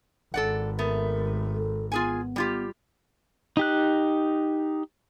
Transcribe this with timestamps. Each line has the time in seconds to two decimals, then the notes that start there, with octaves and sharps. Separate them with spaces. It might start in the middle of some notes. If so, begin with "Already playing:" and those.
0.34 G#1 A4 D5 F#5
0.79 A3 B3 A#4
1.54 A4
1.92 B3 F4 G#4 G#5
2.36 G3 F4 G4
3.57 D#4 G4 F#6